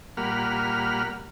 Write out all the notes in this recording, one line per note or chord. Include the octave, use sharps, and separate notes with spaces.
A#2 G3 A#3 F#5 B5 F6